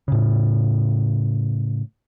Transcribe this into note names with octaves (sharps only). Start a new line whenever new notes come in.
A2 C#3